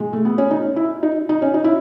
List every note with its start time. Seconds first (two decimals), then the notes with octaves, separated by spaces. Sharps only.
0.00 G#3
0.13 A3
0.25 B3
0.38 C#4
0.51 D#4
0.76 E4
1.03 D#4
1.29 D#4
1.42 C#4
1.54 D#4
1.64 E4